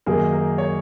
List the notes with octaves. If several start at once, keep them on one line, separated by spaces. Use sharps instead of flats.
F#2 D#3 F#3 A#3 G#4
A#4
C#5